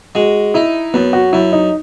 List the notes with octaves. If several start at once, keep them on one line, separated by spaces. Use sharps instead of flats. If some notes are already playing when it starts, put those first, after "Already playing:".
G#3 F#4
D#4 E4
F#2 B3
F#4
F#2 E4
D#4